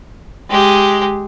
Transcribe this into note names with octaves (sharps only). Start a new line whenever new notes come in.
G#3 G4